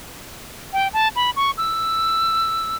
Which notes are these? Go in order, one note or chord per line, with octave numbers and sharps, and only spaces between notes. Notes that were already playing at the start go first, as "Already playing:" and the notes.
G5
A5
B5
C#6
E6